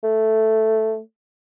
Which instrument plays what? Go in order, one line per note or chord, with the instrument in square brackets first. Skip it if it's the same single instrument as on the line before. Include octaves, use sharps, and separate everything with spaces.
[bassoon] A3